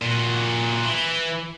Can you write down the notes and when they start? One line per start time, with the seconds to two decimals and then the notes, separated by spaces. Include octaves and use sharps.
0.02 A#2 F#4
0.85 E3